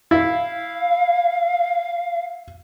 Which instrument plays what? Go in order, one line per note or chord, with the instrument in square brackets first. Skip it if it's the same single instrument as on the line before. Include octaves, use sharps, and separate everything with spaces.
[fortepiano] E4 [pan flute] F5